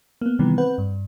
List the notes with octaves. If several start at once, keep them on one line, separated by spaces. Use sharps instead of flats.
A#3 B3
C3 D#3 E3 G3 B3
C4 B4 F#5
G2